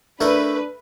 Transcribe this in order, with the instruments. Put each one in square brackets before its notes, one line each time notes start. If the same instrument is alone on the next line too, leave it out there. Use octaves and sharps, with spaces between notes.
[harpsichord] A3 E4 A#4 [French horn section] D4 [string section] B4